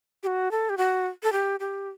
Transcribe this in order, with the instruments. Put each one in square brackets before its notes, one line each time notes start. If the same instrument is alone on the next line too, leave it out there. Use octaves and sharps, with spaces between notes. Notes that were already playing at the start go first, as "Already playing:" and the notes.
[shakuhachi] G4
F#4
A4
G4
F#4
A4
G4
G4